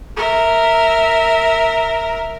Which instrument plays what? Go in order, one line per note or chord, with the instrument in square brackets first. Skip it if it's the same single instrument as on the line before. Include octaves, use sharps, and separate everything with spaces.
[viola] A#4 E5